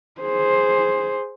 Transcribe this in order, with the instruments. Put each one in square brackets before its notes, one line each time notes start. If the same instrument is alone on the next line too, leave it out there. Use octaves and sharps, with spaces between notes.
[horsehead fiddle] G#4 C5